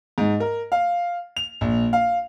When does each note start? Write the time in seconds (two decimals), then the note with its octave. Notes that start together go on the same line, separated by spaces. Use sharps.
0.18 G#2
0.40 A#4
0.72 F5
1.37 F7
1.61 A#1
1.93 F5